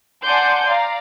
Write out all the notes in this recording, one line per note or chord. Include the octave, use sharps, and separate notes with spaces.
D5 F#5 G#5 A5 C6 G6
D5 F5 A#5